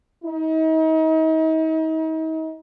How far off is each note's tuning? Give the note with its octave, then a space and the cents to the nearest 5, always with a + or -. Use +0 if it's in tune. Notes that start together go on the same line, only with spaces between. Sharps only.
D#4 +40